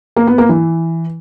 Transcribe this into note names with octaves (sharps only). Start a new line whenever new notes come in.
A#3
B3
A#3
E3